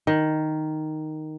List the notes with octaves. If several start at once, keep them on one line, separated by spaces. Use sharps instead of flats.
D#3